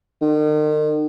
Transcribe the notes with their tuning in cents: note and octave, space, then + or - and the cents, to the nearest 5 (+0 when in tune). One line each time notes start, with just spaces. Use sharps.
D#3 -40